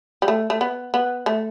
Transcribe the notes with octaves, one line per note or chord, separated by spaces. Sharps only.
G3
A3
A3
B3
B3
A3